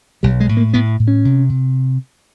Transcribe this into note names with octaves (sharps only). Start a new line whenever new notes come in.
B1 G3
G#3
A2
A#3
A2 B3
A2
C#4
C3
C3